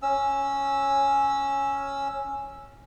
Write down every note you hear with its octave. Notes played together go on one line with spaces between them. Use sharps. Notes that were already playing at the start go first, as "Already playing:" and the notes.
C#4 E6